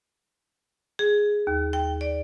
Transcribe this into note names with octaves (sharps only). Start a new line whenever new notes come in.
G#4
D#2
G5
D5